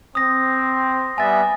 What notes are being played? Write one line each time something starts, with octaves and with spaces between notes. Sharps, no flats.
C4 D#6 A#6
G3 B3 E5 G#5 A6